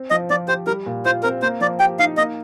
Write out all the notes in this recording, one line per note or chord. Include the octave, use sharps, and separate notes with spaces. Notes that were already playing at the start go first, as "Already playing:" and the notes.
Already playing: C4
F3 D#5
F3 D5
G4 C5
G3 A#4
A#2
F4 C5
C4 A#4
A#3 C5
F3 D5
G4 G5
D#4 F5
A#3 D#5